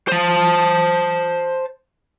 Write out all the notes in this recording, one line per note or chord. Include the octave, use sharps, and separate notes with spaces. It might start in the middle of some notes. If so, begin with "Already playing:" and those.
C5 A5